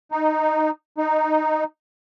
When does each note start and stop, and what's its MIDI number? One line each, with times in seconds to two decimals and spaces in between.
0.12 0.70 63
0.98 1.64 63